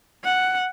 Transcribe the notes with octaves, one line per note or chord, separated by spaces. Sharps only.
F#5